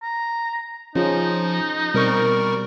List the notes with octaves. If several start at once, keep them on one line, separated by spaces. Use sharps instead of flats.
A#5
F3 C#4 D#4 F4 G#4
B2 G3 C4 A#4 C#6